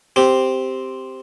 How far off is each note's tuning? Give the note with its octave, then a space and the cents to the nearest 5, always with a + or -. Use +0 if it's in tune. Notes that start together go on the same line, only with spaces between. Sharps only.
C4 +0 G4 +0